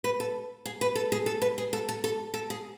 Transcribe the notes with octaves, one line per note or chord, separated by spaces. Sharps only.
B4
A4
G#4
B4
A4
G#4
A4
B4
G#4
A4
A4
A4
A4
G#4